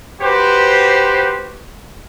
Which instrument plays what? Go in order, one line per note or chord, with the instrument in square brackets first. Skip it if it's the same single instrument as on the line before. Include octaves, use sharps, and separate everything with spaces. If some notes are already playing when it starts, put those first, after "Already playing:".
[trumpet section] F#4 G4 B4 C5